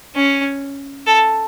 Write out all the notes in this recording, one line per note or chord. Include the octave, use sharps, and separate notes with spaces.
C#4
A4